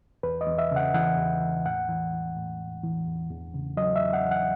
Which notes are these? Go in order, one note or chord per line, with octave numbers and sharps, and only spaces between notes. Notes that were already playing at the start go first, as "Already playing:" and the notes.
E2 B4
D#5
E2
E5
C#3 F#5
E3 F#5
E2
E2
A2 F#5
E3
E3
A2
A2
E3
E2
E2
C#3
F#3 D#5
E5
E2
F#5
E2
F#5